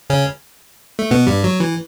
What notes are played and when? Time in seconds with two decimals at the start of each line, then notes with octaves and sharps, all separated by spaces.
0.10 C#3 C#4
0.99 A3
1.11 B2 B3
1.27 G2 G3
1.44 F#3
1.60 E3